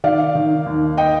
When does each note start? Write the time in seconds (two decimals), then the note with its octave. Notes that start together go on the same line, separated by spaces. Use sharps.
0.04 D#3 D5 F5
0.35 D#3
0.66 D#2
0.97 D#5 G5